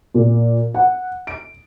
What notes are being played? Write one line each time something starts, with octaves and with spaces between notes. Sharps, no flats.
A#2
F#5
D7